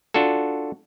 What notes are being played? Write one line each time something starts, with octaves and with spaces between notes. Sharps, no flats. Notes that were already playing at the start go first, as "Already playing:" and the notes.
D4 F4 F#4 A4